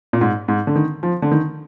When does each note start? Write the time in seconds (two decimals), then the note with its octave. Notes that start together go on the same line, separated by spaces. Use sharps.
0.13 A#2
0.21 G#2
0.48 G#2
0.67 D3
0.75 D#3
1.03 F3
1.22 D3
1.31 D#3